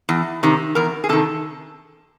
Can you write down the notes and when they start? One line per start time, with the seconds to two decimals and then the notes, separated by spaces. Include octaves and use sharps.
0.09 E2
0.43 C3 D#3
0.75 E2 A#4
1.04 G#4
1.09 C3 D#3 A4